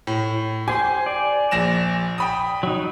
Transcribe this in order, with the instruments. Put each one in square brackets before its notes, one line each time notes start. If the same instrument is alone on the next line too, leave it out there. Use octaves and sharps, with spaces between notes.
[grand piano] A2
[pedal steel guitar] G4 C5 G5 [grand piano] G#5
[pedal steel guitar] D5
[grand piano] A#1 A#6 E7
G5 B5 D#6
[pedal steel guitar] F#3 D#4